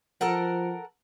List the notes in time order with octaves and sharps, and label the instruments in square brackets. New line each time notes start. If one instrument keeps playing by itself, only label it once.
[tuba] F3 [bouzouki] A4 A#4 F#5